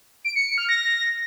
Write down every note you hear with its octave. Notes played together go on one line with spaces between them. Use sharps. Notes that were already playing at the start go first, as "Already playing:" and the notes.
D7
C#7
C#7
F6
A#6